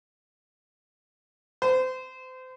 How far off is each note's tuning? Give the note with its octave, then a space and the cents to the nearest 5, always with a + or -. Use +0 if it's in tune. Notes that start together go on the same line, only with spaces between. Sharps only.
C5 -30